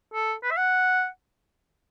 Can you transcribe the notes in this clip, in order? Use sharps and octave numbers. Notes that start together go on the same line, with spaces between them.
A4
B4
E5
F#5